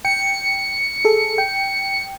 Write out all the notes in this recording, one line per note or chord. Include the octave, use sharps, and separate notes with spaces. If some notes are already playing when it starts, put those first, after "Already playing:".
G5 C#7
G#4 A4
G5